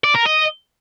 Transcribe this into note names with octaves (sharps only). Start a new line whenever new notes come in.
D5
A#4
D#5